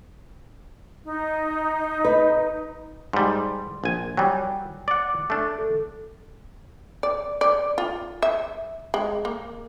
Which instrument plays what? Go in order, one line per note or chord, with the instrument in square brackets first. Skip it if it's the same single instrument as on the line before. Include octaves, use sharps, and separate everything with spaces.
[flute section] D#4
[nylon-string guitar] B4 [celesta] D#5
[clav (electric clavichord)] G#2 G3 [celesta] C6
[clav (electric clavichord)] A#1 G#5
[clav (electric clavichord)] F#3 G3 [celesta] G5 G#5
[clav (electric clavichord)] D5 F#5 [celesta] D6
[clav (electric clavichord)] A3 D4
[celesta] A4
[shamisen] D5
D5
F4
E5
G#3
A#3